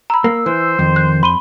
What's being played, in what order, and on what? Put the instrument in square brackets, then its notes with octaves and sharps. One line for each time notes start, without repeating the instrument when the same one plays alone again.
[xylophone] A#5 B5 [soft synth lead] E6
[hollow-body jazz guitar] A#3
[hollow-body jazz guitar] E3 [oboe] C5
[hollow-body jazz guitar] F2 [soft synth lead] D#3
[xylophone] F#6
[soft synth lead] B5 [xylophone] C6 D#7 G7